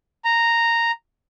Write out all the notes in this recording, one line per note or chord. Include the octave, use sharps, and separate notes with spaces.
A#5